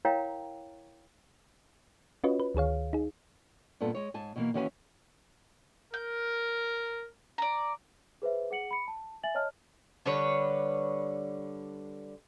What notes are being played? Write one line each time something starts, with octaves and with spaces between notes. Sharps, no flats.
E4 A#4 C#5 F5 G5 A#5
C#4 F4 F#4 B4 C#5 D#5
B4
D2 D#3 G#4 C#5 F5
D#4 G#4
G2 A#2 B3 A4
G#3 C#5
G#2 G#5 A5
B2 E3 A#3
D#2 E3 C#4 F#4 B4 G#5
A#4 G6
D5 A#5
G#4 B4 C5 E5
G#4 F#5 C#7 F#7
B5 C#7
A5
E5 G#5 A6 F#7
C#5 D#5 A5 F6
D3 G3 B4 C#5